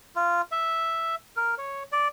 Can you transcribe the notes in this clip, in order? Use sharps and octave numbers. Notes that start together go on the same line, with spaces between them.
F4
E5
A#4
C#5
D5